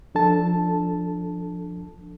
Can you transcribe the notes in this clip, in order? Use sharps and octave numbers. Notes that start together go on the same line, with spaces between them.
F3 D4 A4 A5